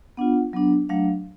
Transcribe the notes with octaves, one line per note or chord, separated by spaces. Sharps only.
B3 D4 F4 F#5
F#3 B3 D4
F#3 A3 D4 F5